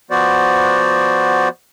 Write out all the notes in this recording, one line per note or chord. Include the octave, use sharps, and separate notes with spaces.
F3 B3 F#4 C5 D5